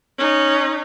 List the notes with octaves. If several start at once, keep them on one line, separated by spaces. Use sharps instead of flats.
C#4 D#4